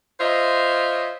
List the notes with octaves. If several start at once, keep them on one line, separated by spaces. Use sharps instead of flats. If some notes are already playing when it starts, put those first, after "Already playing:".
F4 C5 C#5 D#5 E5